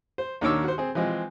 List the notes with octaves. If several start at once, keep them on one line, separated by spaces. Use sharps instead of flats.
C5
D#2 D#3 D4 C#5 D6 E6
F#4 C5
C4 G#4
E3 F3 G#3 C4